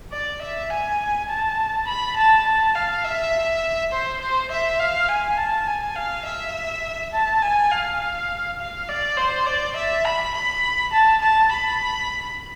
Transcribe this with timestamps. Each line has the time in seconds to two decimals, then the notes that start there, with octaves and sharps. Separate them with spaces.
0.12 D5
0.42 E5
0.70 G#5
1.29 A5
1.87 B5
2.16 A5
2.46 A5
2.75 F5
3.04 E5
3.92 C5
4.21 C5
4.51 E5
4.79 F5
5.09 G#5
5.38 A5
5.67 G#5
5.96 F5
6.25 E5
7.13 A5
7.42 G#5
7.72 F5
8.60 F5
8.89 D5
9.17 C5
9.47 D5
9.76 E5
10.05 B5
10.34 B5
10.93 A5
11.22 A5
11.51 B5